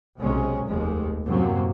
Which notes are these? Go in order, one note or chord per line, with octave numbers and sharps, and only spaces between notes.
B1 C3 G#3 C#4
F1 D#2 G#3
F#2 A2 C3 F#3 A#3